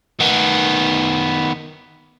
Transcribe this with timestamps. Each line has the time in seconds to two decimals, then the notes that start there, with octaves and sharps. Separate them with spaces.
0.20 D#3 B3